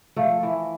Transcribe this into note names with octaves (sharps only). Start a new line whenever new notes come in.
F3 A3
E3